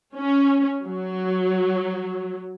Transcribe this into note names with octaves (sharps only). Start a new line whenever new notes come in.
C#4
F#3